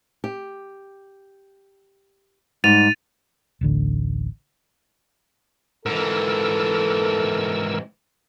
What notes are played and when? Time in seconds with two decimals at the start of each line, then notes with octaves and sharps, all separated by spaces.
0.24 G4
2.64 G#2 G3 A6 D#7 F7
3.61 D1 A1 D3
5.86 G#2 E3 A4 A#4 E6